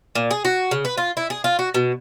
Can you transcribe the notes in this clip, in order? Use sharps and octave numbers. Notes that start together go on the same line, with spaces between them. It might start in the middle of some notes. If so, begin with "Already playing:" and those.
A#2
G#4
F#4
C#3
B4
F4
E4
G#4
F4
F#4
B2